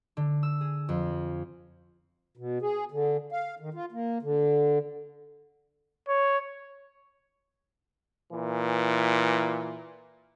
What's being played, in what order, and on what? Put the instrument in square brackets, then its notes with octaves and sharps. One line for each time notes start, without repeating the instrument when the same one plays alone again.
[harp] D3
E6
G#4
F2
[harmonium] B2
G#4
D3
F5
D#3
F4
A#3
D3
[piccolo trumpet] C#5
[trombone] A#2 [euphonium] E3